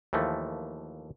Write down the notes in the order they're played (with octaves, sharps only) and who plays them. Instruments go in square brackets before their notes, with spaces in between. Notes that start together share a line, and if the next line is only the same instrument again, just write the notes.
[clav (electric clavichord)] D#2 E3 F3 A3